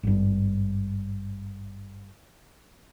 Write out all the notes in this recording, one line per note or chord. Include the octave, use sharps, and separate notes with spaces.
G#1 G2